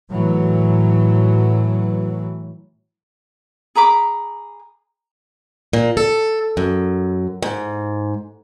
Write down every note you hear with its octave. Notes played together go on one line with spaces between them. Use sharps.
A2 E3 F#3
G#4 A#5 B5 D6
A#2
A4
F#2
G#2